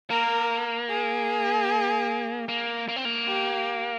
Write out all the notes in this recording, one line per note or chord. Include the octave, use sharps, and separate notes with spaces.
A#3 A#4
G#4
A#3
A#3
C4
A#3
G4